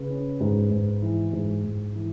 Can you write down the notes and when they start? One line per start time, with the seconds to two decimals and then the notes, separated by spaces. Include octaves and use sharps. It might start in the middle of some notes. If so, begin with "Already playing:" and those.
Already playing: C#3 B4
0.10 C#4
0.41 G#2
0.71 G#2
1.02 E3
1.33 G#2
1.64 G#2
1.95 E3